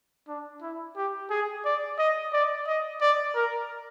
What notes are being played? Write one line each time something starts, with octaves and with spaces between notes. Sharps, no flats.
D4
E4
G4
G#4
D5
D#5
D5
D#5
D5
A#4